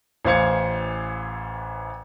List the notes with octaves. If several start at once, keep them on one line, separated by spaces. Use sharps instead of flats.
A1 E3 C5 F5 G#6 C#7